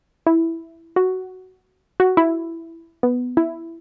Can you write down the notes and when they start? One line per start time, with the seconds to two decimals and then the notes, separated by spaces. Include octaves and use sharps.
0.27 E4
0.96 F#4
2.00 F#4
2.17 E4
3.03 B3
3.37 E4